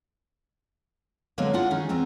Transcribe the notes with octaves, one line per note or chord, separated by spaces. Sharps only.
D3 F#3 G#3 A#3 B3
D4 E4 F4 F#5
D#3 C#4 D#4 G#4
E2 B3 C4 A#5